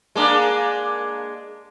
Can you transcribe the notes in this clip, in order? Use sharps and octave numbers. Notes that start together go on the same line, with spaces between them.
G#3 A#3 D4